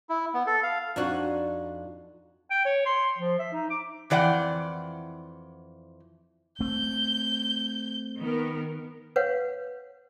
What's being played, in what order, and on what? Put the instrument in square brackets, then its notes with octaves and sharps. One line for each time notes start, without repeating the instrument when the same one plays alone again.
[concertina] E4
B3
A4
F5
[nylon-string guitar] F2 D4 D#4 F#4
[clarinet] G5
C#5
C6
F3
E5
D#4
D6
[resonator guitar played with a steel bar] F2 E3 D5 F#5 G5
[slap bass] A3 C4 [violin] G6
[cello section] D#3 B3 A#4
[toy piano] B4 C#5 F5 F#5